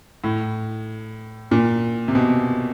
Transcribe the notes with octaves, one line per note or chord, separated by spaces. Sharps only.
A2
A#2
C3
B2